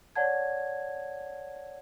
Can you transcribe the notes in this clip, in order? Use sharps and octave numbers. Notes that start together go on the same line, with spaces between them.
C#5 D5 F#5 A5 G#6